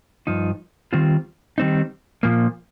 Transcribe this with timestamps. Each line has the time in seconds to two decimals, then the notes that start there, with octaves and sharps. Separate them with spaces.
0.27 G2 F3 D#4
0.93 D#3 G3 C4 F4
1.58 D#3 G3 C4 D#4
2.23 A#2 F3 A#3